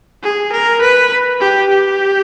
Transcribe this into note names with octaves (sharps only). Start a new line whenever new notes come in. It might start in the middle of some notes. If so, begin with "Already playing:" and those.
G#4
A#4
B4
G4
G4